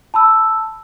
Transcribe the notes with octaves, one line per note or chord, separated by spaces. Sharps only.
A5 B5 E6